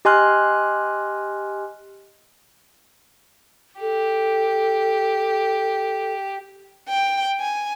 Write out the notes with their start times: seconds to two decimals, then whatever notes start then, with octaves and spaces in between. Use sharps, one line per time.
0.05 G4 D#5 G#5 C6 F6 F#6
3.80 G4 A4
6.89 G5
7.40 G#5